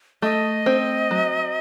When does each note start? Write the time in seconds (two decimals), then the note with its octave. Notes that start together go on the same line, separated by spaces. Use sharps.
0.22 A3 D#5
0.66 C4
1.11 F#3